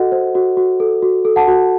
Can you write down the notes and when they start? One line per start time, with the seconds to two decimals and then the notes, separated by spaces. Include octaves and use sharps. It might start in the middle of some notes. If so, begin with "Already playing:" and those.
Already playing: F#4 A4 D#5 F#5
0.12 C5
0.35 F#4
0.57 F#4
0.80 A4
1.03 F#4
1.25 A4
1.36 F#5 A5
1.48 F#4